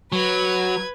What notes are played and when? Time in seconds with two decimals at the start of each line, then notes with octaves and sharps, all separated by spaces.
0.12 F#3 B4 G#6